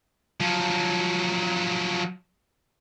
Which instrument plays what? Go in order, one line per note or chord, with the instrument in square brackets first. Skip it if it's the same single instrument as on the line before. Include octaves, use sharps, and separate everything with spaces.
[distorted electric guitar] F3 F#3